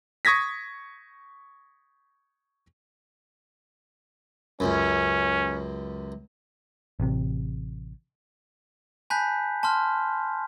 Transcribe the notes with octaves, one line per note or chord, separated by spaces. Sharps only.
C#6 D#6 G#6 A#6 B6
C#2 F#2 C#4
A1 C3
G#5 A5 B5 F#6 G6 B6
A5 C6 F6